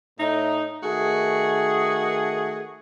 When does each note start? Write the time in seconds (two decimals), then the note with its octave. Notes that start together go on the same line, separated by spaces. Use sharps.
0.19 A2 D#4
0.83 D#3 A3 F#4 G#4